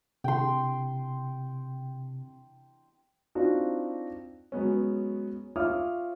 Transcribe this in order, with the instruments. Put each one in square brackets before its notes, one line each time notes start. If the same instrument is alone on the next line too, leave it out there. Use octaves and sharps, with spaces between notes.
[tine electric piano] C3 [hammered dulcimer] G5 C6
[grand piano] C4 D4 D#4 F4 F#4
F#3 G#3 B3 C#4
F4 C#5 E5 D6 D#6 F6